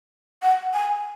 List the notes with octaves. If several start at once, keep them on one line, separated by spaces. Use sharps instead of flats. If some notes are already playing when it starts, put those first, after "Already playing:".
F#5
G#5